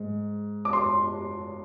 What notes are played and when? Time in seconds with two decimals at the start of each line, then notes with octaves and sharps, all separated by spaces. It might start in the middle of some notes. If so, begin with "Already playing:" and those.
Already playing: G#2
0.65 D6
0.73 C6